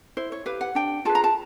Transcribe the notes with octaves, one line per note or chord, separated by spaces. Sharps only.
E4 C5
C#5
G4 B4 F5
F#5
D4 G5
F4 G#4 B4 A5
A#5
A5